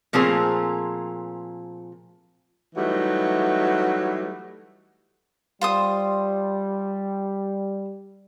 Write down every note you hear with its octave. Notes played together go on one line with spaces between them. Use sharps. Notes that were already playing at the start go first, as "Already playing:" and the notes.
A#2 F3 A3 C4 G#4 A#4
E3 F#3 G3 A3 D#4
G3 F4 C5 D#6